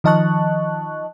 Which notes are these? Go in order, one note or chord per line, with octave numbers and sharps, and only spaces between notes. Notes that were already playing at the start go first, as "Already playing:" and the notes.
D#3 F3 D#5 A5 C#6 F#6